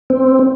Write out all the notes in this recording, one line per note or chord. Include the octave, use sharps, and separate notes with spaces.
C4